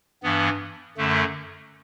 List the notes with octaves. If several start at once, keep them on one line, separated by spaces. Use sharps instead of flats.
G2 E3 B3
F#2 D3 A3